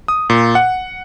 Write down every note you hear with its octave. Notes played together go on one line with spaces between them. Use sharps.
D#6
A#2
F#5